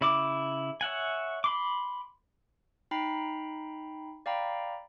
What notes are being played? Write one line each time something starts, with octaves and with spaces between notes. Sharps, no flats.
C#3 E4 D6
C#5 E5 F#5 G#5
B5 C6 D6
D#4 G5 A#5 B5 C7
D5 F5 G5 A#5 B5